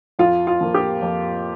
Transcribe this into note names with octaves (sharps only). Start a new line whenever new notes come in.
F2 F4
F4
F3 A#3
G4
F2